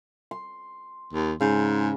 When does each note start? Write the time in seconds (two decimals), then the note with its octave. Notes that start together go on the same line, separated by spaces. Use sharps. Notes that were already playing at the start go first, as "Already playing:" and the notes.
0.31 C6
1.13 D#2
1.41 G#2 C#3